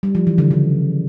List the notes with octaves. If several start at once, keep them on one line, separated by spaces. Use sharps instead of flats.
G3
F3
E3
D3
C#3